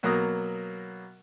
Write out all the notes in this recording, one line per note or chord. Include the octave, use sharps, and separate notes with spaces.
B2 F#3 A#3 A#4 D#6